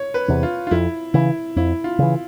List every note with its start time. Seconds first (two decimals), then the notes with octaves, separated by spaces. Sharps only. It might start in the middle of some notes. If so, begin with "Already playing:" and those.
Already playing: C#5
0.14 B4
0.28 E2 C3
0.43 F4
0.67 F4
0.71 F2 E4
1.14 C#3 E3 E4
1.56 F2 E4
1.84 F4
1.99 C#3 E3